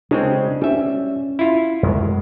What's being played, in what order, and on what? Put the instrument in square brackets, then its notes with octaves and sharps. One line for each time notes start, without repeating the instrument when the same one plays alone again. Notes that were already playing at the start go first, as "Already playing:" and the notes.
[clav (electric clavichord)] C#3 G#3 C4 [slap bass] D4
[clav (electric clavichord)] G3 E5 [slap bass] C#4
[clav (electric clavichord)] E4 F4
[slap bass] F#2 G#3 A3